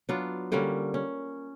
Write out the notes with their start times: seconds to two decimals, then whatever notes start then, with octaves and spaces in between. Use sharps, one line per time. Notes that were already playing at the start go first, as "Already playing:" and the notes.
0.09 F#3 B3 D4 F4
0.52 D3 G3 A#3 C#4
0.94 C#4